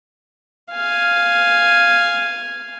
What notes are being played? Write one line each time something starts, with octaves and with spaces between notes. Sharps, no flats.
F5 G#5